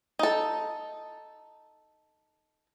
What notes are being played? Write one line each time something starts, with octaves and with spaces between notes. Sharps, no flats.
D#4 A4